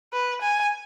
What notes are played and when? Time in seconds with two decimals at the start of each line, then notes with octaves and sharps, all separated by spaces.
0.13 B4
0.42 G#5